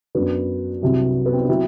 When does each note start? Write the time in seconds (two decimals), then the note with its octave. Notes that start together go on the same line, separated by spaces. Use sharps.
0.15 F#2 F#3 B3 D4
0.82 C2 C3 F#3
1.26 B3
1.33 C4
1.41 D4
1.48 F#3 C4 E4